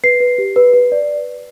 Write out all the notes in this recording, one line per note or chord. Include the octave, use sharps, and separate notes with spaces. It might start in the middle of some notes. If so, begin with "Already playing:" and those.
B4 C7
B4
G4
B4
B4
D5